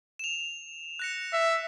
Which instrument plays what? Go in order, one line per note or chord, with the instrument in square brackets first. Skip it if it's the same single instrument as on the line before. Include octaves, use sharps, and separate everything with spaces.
[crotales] E7 F7
F#6 A#6 C#7
[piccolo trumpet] E5